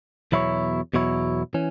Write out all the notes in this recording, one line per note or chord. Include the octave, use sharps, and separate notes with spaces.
E2 B2 F#3 E4 C#5
E2 B2 F#3 E4 C#5
E3 C#4